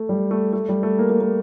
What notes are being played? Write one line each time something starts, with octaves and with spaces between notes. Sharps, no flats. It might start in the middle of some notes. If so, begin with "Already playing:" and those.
Already playing: A3
G3
A3
A3
G3
A3
A#3
A#3
A#3